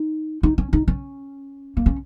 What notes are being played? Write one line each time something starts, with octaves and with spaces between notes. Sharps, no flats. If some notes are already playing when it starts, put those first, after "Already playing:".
Already playing: D#4
D#4
C#4
D#4
C#4
A#3
C#4